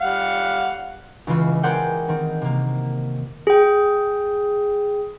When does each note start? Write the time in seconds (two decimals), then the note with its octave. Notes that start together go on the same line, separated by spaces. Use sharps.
0.01 G3 F5 F#5
1.27 C#2 E3 F4
1.63 G#4 A#4 C5 D5 F#5 G5
2.08 D#3 C4
2.42 C3 A#3
3.47 G#4 G5